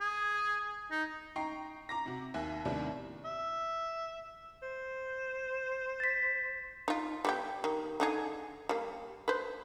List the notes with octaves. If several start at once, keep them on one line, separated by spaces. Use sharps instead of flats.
G#4
D#4
D#4 G5 A#5 C#6 C7
A#5 D6 A#6
C3 F#4
D#2 E5 G#5 F#6
D#2 A2 C3 G3 B3 D4
E5
C5
A6 B6
D#4 F4
G3 B3 G4
D#3
D3 D#4 G#4
G3 A#3
B4 C5